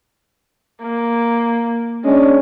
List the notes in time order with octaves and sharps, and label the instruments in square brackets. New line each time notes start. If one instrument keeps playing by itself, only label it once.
[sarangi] A#3
[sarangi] G#3 [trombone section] C#4 D4